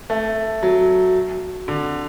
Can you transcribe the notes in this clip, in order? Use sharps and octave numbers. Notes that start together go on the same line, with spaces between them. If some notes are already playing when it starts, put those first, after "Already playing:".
A3
F#3
D3